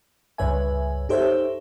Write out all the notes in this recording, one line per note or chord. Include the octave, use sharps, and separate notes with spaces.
C#2 G2 B4 C#5 E5 G#5
D#4 G4 A4 C5 C#5 E5